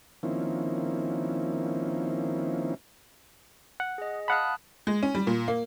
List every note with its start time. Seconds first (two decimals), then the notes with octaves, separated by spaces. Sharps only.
0.23 D#3 F3 A#3 C4 C#4 E4
3.80 F#5
3.98 G#4 D#5
4.28 F5 F#5 A5 B5 D#6 F#6
4.87 G#3
5.03 C#4
5.15 G3
5.27 A#2
5.48 A#3